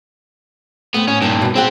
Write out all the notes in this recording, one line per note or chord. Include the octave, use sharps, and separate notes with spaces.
A3 B3 C4
A2 C#4
G2 A#2 A#3 D#4
B2 G3
C4 G4 G#4 C5 F#5